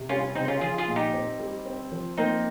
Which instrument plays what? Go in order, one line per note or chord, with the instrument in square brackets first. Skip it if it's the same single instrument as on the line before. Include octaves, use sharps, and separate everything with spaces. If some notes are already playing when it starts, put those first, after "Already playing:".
Already playing: [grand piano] C3
[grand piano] G3 [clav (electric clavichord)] C#4 F4
[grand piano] C#3 [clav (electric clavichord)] C4 D#4
[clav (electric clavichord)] C#4 F4
[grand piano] F3 [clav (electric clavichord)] F4 G#4
[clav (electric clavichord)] F4 G#4
[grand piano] A#2
[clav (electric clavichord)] D#4 G4
[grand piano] C4
G3
C4
F3
[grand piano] A#3 [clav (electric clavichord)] C4 D#4